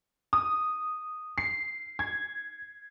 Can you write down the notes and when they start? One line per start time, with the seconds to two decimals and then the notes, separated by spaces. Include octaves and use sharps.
0.33 D#6
1.38 C7
1.99 G#6